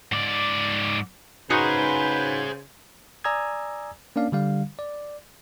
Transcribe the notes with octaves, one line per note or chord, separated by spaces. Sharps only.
G#2 D5
C#3 D#4 F#4 G#4 B4 C5 G#5
D5 G#5 A#5 D#6 E6 G#6
A#3 C#4 D4 D5 F5
D3 G3 F5
D5